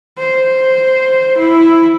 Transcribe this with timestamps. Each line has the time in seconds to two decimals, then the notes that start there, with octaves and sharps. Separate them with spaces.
0.18 C5
1.37 E4